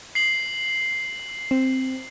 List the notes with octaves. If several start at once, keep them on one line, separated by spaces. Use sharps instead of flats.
C7 F#7
C4